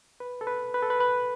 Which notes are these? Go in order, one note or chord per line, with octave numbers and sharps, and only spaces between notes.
B4
A4
B4
B4
A4
B4
B4